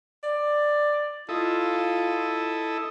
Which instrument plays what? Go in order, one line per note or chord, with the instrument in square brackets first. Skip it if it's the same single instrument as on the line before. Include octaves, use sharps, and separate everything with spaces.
[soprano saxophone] D5
[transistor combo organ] E4 A4 D#5 [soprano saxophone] F4